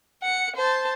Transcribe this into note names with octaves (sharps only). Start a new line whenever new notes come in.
F#5 C#7
C5 A5